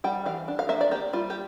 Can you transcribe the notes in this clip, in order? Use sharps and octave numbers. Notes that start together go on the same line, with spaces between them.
G3 G5
E3 F5
D4
F5
A#3 E5
D5
A#3 G4
G3 F4
G4